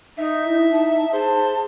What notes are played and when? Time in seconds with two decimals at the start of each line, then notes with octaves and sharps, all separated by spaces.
0.18 D#4 E5
0.46 E4
0.72 D#4 A5
1.13 G#4 C5 A5